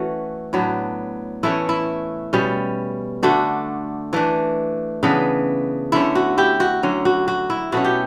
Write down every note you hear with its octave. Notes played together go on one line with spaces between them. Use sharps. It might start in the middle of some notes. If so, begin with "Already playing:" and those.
Already playing: E3 A3 C#4 F#4
A2 F#3 B3 D4
E3 A3 C#4 E4
E4
B2 G3 C#4
D3 A3 D4 F#4
E3 A3 D4
C#3 E3 B3 D4
D3 A3 C#4 E4
F#4
E4 G4
F#4
D3 F#3 C#4
F#4
F#4
E4
B2 A3 C#4 F#4
G4